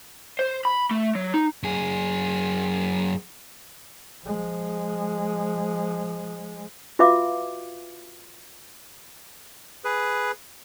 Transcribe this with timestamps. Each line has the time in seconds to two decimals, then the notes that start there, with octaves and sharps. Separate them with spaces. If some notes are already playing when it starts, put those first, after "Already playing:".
0.39 C5
0.65 B5
0.91 A3
1.15 F#3
1.34 D#4
1.63 F#2 G#4
4.26 F3 G#3
6.99 F4 F#4 B4 E5 F5 D6
9.84 G#4 B4